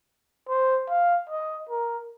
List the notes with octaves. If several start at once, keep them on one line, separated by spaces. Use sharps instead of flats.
C5
F5
D#5
A#4